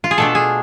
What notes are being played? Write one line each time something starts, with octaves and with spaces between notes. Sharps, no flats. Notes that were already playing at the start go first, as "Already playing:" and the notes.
F4
G#4
B2 A3 D4 A4
G#4